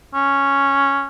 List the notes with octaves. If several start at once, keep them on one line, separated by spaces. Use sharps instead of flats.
C#4